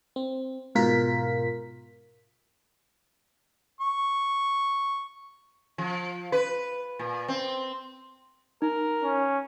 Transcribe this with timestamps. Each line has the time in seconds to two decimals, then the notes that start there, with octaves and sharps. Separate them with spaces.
0.16 C4
0.75 G#2 B2 F4 A#4 B6
3.81 C#6
5.78 F3
6.32 B4
6.99 A#2
7.28 C4
8.62 D#4 A#4
9.03 C#4